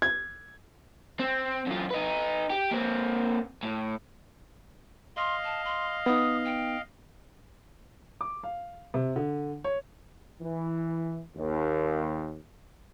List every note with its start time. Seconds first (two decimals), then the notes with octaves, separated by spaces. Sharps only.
0.02 G#6
1.19 C4
1.67 F#2 F4
1.91 D#4 B4
2.50 G4
2.71 A#3 C4
3.63 A2
5.17 D#5 F5 C6
5.44 A5
5.65 C6
6.06 B3 D#4 D#6
6.45 G5
8.21 D6
8.44 F5
8.94 C3
9.16 D3
9.64 C#5
10.42 E3
11.36 D#2